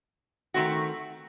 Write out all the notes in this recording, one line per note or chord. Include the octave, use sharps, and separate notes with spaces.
D#3 A3 C4 F#4